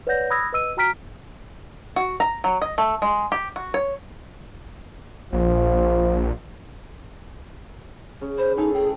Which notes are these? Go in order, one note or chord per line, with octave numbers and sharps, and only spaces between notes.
B4 C#5 D5 F#5 G6 A#6
B5 D#6 E6 F#6 G#6 A#6
B4 D#5 E6 D#7
F#4 G5 A#5 F6 B6 D7
F#4
A#5
F#3
D#5
A3
G#3
G4
F#4
C#5
A#1 F3
C#3
B4 C5
A2 D#4 G#4 A4
G#4 G5